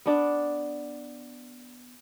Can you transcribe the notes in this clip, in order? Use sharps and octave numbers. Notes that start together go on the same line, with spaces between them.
B3 D4 D5